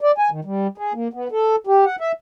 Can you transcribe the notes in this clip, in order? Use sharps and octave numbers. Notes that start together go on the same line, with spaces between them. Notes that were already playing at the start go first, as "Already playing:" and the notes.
D5
G#5
D#3
G3
G#4
A#3
B3
A4
G4
F#5
E5